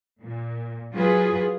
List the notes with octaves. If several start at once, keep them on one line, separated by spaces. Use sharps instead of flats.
A#2
F#3 F4 G#4 B4